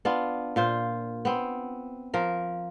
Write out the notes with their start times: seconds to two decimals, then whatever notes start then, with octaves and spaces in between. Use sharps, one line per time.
0.05 B3 D4 F4
0.56 A#2 F4 C5
1.25 B3 C4
2.14 F3 A#4